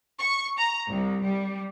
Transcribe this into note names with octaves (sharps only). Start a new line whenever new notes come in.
C#6
A#5
C2
G3